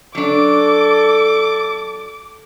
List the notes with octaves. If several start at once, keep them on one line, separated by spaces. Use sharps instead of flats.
F#3 D4 A4 D6